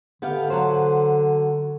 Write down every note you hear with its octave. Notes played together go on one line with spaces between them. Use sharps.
D3 B3 G4 F5
F#3 C5